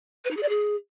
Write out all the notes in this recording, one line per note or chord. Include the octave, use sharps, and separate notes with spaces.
B4
D#4
G#4
D5
G#4